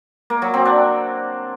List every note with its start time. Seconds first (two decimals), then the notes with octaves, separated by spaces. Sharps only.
0.30 A#3
0.42 F#3
0.54 C4
0.65 D4